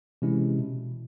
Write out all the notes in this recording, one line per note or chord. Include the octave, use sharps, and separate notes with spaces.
C3 E3 G#3 C#4 E4
B2